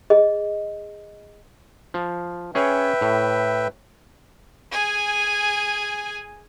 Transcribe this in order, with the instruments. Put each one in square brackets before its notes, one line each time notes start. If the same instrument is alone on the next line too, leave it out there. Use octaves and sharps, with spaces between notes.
[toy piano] G#4 D#5
[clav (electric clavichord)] F3
[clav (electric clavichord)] C#4 G#4 C#5 [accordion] B4 E5 G5
[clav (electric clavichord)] A2
[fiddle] G#4 G#5